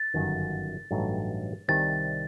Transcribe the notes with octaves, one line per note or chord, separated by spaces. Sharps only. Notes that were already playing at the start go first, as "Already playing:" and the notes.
Already playing: A6
G1 F#2 D#3
A1 G2 F#3 A3 D#4
C2 C3 D#3 G3 C4 A6